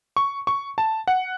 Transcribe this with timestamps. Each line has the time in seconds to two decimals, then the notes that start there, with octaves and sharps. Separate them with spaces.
0.16 C#6
0.47 C#6
0.78 A5
1.08 F#5